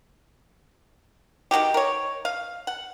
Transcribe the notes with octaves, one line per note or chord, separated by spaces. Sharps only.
D#3 F#3 F#4 G4
A#4 C#5
F5
F#5